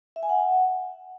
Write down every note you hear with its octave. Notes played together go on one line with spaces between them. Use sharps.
E5
G#5
F#5